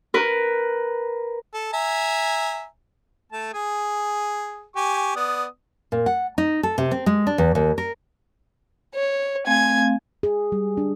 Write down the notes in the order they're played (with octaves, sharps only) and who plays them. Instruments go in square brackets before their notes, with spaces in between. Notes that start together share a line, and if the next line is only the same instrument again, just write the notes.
[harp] A#4 B4
[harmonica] A4
E5 G#5 A#5
A3 A5
G#4 G#5
G4 G#5 C#6
B3 D5 D#6
[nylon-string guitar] A#2
F#5
D#4
A4
C3
C4
G#3
D4
E2
D#2
A#4
[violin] C#5
[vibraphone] A3 C4 F5 [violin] G#5 G#6
[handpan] G#4
G3
D4